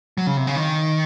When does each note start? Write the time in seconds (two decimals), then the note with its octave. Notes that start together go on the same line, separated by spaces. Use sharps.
0.18 F#3
0.27 C#3
0.37 C3
0.47 C#3
0.56 D#3